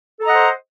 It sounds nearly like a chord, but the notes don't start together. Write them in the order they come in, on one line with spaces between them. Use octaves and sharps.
A4 A#5 D#5 F#5 C5